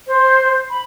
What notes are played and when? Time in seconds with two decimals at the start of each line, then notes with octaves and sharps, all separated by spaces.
0.07 C5
0.70 B5